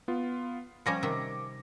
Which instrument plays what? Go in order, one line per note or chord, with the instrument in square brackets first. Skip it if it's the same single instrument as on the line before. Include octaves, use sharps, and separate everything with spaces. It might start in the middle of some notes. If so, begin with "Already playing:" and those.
[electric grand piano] B3 F4
[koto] F3 G3 C#4 [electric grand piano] D6 A#6 C#7
[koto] C3 D#3 E5